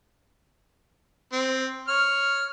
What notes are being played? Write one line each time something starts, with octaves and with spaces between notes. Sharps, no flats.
C4
C#5 F6